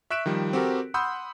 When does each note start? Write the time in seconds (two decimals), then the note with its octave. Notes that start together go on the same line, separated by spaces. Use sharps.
0.11 E5 C#6 F#6 B6 D7 E7
0.26 D#3 F3 G3
0.53 C4 F#4 G4 A4 A#4
0.94 F#5 B5 C6 D#6 E6 G6